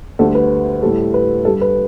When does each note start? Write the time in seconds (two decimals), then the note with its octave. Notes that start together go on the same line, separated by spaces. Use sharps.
0.19 D2 D3 G3 A4
0.35 B4
0.82 A2 G3 A4
1.14 B4
1.45 G2 G3 A4
1.61 B4